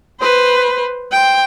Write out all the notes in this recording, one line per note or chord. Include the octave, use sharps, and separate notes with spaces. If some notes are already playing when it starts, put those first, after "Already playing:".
B4 C5
C5 G5